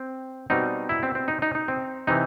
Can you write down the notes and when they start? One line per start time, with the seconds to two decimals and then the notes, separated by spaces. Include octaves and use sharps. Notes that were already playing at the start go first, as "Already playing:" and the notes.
Already playing: C4
0.50 B2 G3 C4 D#4
0.89 E4
1.03 C4
1.15 C4
1.28 D#4
1.42 D#4
1.55 D#4
1.68 C4
2.07 C3 E3 D#4